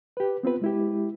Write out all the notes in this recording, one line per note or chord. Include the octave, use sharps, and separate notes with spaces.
G4 B4
B3 C4 F4 B4
G#3 E4 G4